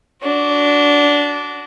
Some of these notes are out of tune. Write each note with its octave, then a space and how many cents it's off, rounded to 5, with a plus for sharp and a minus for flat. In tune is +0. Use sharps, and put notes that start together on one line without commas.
D4 -15 F#4 +0